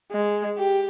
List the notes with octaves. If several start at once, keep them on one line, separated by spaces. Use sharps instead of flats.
G#3
G4